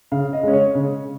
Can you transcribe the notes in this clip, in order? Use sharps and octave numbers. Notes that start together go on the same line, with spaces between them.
C#3 F5
D#5
G#3 C#4
C#5
C#3